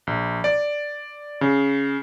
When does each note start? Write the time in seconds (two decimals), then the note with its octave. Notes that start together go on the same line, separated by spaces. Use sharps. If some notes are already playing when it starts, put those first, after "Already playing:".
0.07 A#1
0.44 D5
1.41 C#3